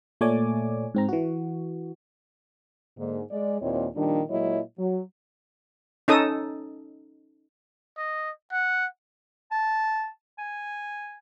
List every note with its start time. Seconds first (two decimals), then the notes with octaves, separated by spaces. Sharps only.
0.21 A#2 A3 C#5 D5 G#5 D6
0.95 G#2 C4 A#5
1.09 E3 F#4
2.97 G#2 D3 A#3
3.31 G#3 D5
3.61 D#2 A#2 C4 E4 C#5 D#5
3.96 A#2 D#3 F3 G3 D4
4.29 A#2 F#3 G#3 E4 C#5 D#5
4.78 F#3
6.08 C#4 D#4 A4 D#6
7.97 D#5
8.52 F#5
9.51 A5
10.39 G#5